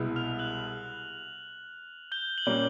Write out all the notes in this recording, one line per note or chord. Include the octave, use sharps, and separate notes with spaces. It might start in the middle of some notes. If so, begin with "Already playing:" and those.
Already playing: C2 B2 G#3 B3 E4
F6 F7
F#6 F#7
G6 G7
F#7
A#2 G3 A#3 C#4 G6 G7